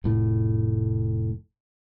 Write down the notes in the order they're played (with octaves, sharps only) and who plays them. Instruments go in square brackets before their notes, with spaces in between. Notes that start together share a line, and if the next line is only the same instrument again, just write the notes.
[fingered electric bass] F1 A2